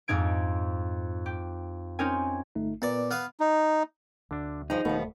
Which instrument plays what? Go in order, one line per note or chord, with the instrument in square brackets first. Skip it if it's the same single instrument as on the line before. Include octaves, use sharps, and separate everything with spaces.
[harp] F2 G#2 D#4 G#6 D7
G4
C4 C#4 D#4 A#4 G#5
[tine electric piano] G1 A3 D#4
[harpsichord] A#2 D5 [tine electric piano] B3 B4 D6
[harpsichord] B3 B4 F5 [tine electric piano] F6
[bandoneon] D#4
[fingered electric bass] D2 [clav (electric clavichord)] D3 D4
[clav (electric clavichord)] G2 [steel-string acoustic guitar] F3 G#4 [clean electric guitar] D#4
[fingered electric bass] D#1 A3 [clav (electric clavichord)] D#2 B2 [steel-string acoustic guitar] F3 B3